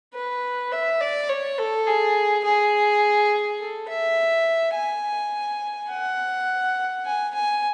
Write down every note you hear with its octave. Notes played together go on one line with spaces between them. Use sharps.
B4
E5
D5
C#5
A4
G#4
G#4
A4
E5
G#5
F#5
G#5
G#5